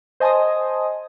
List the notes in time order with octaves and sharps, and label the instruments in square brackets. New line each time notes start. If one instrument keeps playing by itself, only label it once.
[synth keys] C5 D#5 G#5 A5 C6 D#6